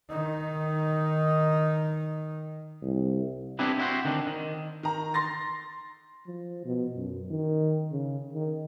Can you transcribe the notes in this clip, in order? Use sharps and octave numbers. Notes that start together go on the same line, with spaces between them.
D#3 D#4
C2
B3 C4 D4 E4 G4 B4
C4 E4 F#4 C5
D3 D#3 C4 D4
D#3
D#3 A#5
C6 A6 A#6
F3
B2
F#2
D#3
C#3
D#3